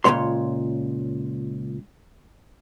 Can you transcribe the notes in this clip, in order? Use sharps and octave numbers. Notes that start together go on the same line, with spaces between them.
C#2 A#2 E3 A3 C#5 C6